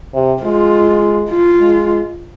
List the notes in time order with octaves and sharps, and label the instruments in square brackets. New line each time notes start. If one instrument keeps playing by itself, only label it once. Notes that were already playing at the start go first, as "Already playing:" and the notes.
[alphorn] C3
[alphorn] G#3 [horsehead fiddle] F4
[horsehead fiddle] F4
[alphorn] G#3